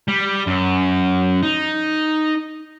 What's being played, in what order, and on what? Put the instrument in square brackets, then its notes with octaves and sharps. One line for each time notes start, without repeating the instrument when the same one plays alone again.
[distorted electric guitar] G3
F#2
D#4